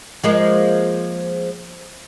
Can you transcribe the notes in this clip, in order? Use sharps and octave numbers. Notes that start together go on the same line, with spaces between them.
F3 G#3 A#3